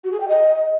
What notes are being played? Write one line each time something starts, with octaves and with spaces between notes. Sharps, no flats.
F#4
G#4
G5
D#5